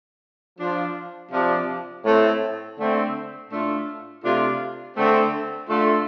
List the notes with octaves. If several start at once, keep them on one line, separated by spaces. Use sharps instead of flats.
F3 D4 F4
C3 F3 D4
A2 A3 C4
D3 A3 C4
A2 A3 D4 F4
C3 A3 D4 F4
D3 A3 C4
D3 A3 F4